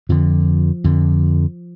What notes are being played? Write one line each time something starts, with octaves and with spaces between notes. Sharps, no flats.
F2 D3 F3
F2 D3